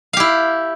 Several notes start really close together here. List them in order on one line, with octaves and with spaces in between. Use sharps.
F5 G4 E4